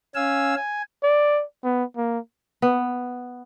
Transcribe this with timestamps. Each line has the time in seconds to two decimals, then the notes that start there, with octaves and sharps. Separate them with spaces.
0.15 C#4 F5 G#5 E6
0.56 G#5
1.03 D5
1.64 B3
1.97 A#3
2.62 B3